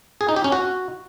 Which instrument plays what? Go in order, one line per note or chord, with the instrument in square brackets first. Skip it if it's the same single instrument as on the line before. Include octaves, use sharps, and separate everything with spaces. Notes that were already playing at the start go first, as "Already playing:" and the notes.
[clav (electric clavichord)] G#4
D#4
G4
C#4
F#4